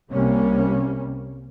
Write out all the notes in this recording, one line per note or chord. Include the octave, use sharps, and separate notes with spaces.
C2 C3 G3 A#3 C#4